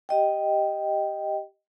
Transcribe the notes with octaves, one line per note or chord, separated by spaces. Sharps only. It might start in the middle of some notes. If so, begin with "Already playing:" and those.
G4 D#5 G5